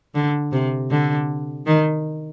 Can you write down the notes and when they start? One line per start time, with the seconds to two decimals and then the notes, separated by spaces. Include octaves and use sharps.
0.15 D3
0.52 C3
0.91 D3
1.67 D#3